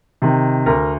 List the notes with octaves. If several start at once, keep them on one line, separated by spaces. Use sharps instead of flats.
C3 D#3
D2 A#4